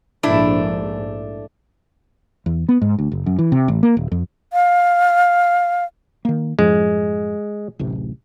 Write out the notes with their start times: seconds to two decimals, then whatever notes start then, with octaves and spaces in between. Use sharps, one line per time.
0.23 A#1 G#2 A3 D4 E4
2.46 E2
2.69 B3
2.82 G#2
2.98 D2
3.12 F#1
3.26 F#2
3.39 E3
3.52 C3
3.68 A1
3.83 A#3
3.97 D#1
4.11 F2
4.53 F5
6.25 D#3 A#3
6.59 F#2 A2 F3 G#3
7.79 D1 A1 C3